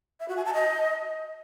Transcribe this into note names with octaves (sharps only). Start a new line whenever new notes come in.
E5
F#4
G#5
A5
D#5